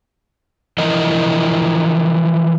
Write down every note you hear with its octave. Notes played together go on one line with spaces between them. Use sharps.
E3 F3 E4 A#4 D#5